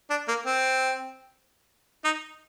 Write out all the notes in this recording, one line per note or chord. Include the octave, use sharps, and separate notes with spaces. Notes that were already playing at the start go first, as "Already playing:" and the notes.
D4
A#3
C4
D#4